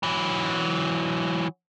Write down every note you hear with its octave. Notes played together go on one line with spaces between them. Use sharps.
E3 F#3